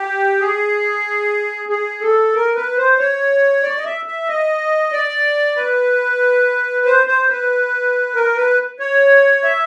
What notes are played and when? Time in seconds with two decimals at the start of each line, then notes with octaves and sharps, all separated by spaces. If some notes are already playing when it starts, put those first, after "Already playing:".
Already playing: G4
0.41 G#4
1.69 G#4
2.01 A4
2.34 A#4
2.55 B4
2.77 C5
2.99 C#5
3.63 D5
3.78 D#5
3.85 E5
4.06 E5
4.28 D#5
4.92 D5
5.56 B4
6.86 C5
7.07 C5
7.29 B4
8.15 A#4
8.36 B4
8.80 C#5
9.44 E5